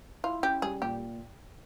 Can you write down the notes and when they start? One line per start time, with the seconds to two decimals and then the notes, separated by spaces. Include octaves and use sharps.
0.24 E4 F4
0.43 C#4 G4
0.62 G3 G#4
0.81 A#2 G4